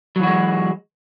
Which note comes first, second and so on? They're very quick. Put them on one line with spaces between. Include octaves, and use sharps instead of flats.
F#3 E3 F#4 G#3